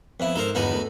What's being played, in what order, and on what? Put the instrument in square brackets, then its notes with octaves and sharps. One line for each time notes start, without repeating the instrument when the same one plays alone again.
[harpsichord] F2 E4 [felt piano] B3 B4
[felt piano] G#2 [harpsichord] A4 A#4 C5
[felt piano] G1 E2 [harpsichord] B3 D#4 F#4
[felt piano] A3